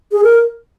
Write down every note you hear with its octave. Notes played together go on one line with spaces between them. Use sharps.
G#4
A#4